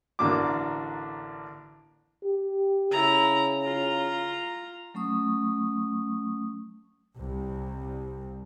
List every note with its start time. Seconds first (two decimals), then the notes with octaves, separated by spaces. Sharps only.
0.19 A1 D3 A#3 D4 F#4 D6
2.23 G4
2.91 C#3 E4 A#5
3.61 F4 A#5
4.94 F#3 A3 C#4 C#6 D#6
7.17 C2